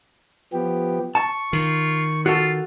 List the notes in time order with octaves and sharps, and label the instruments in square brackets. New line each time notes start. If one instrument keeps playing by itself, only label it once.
[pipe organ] F3 B3 G4
[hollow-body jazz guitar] A5 [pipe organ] C#6
[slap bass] D#3 [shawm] F4
[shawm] F4 [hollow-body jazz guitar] F#4 A4